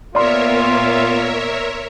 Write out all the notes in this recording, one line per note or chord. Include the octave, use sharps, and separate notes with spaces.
A#2 B3 F4 A#4 C#5 D5 E5 C6